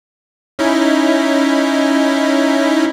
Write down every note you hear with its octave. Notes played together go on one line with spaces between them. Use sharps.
C#4 D#4 E4